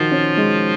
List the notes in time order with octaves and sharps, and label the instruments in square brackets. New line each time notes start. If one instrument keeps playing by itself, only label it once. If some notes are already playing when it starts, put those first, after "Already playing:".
Already playing: [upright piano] D#3 F#4 [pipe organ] F3 F4
[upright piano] C#4
G#3